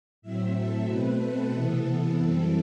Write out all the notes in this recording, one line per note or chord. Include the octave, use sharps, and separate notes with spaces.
A2 F#3 C4 E5
A4
B2 A3 C4 B4
A4
C3 E3 B3
F#2 E3 G3 C4